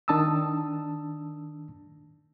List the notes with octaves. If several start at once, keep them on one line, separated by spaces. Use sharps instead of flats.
D#3 D4 A5 D#6 E6